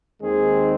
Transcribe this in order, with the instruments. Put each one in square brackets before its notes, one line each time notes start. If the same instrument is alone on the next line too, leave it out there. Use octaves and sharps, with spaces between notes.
[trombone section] D#2 D#3 G#3 C4 G#4